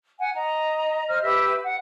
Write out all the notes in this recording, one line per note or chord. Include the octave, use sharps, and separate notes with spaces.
F#5 G#5
D#5 A#5
C5 D#5 F6
G4 B4 E5 E6
F#5